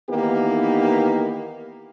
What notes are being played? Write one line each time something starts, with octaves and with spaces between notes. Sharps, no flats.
D#3 E3 A#3 B3 D#4 G4